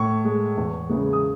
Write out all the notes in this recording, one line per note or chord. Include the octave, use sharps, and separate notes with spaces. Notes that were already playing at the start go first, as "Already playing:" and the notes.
Already playing: A2 C#6
G#3
E2
C#3 E3 G#3
D#6